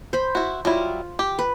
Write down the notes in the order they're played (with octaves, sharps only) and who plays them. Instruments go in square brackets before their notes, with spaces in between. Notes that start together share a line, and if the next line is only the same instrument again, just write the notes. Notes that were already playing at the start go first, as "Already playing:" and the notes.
[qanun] C5 B5
[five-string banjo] E4 F#4
[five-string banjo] F#3 G3 E4 [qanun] F4
[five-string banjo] G4
[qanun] B4